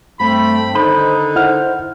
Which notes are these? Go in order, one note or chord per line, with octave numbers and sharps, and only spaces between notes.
G2 A3 C4 B5
D3 D#3 D#4 A#4 C5 D#5 B5
E4 C5 F#5 F6